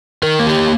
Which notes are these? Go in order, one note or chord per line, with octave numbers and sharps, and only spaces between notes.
D#3 A#4
A#3
G4